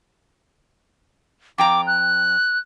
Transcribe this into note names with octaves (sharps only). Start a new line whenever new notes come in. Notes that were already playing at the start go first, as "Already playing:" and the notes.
F2 G5 A#5 D6
F#6